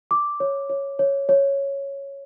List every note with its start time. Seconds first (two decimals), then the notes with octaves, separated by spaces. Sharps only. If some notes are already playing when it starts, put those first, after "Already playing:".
0.11 D6
0.40 C#5
0.69 C#5
0.99 C#5
1.29 C#5